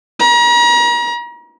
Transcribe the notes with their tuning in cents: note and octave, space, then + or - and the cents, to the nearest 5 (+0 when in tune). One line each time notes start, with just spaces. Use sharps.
A#5 +40